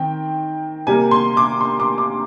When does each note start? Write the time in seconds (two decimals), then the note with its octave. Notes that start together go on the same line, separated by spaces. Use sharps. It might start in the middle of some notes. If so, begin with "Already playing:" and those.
Already playing: D#3 C4 G5
0.87 C3 G3 A#3 G#5
1.11 C6
1.37 D6
1.61 C6
1.80 D6
1.98 D6